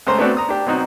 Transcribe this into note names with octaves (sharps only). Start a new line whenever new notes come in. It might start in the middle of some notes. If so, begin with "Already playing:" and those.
C#2 A3 C5 A#5 C6
A3 B3 C4 D4 F#4 A4
A#5 D#6
D4 G4
B2 F#3 C4 D#4 F#4